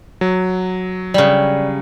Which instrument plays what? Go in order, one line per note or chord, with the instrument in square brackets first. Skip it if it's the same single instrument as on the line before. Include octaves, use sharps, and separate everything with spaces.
[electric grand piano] F#3
[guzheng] C#3 G3 [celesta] D5